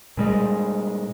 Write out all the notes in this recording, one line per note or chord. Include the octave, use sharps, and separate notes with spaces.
A#2 G3 G#3